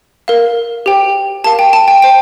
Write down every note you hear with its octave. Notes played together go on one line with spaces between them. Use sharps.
A#4 F5
G4 C5 G5
G4 A#4 F5 A5
G5
A5
G5
C5 G5